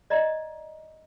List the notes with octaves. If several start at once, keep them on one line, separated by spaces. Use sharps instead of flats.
D5 D#5 A#5